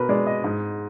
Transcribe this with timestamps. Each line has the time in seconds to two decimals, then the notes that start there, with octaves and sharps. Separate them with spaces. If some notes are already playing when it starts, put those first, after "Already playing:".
Already playing: B2 A#4 B4
0.09 G#3 D5
0.27 D#5
0.44 G#2